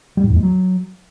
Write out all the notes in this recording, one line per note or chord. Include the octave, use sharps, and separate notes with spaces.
G3
G#2
E2
G#3
F#3